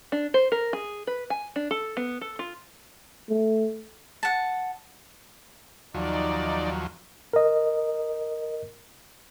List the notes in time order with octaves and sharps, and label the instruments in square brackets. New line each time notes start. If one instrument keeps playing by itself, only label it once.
[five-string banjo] D4
C5
A#4
G#4
B4
G#5
D4
A4
B3
A4
F4
[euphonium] A3
[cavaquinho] F#5 A5
[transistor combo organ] D#2 F3 F#3 [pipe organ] D#4 D5
[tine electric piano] A#4 D#5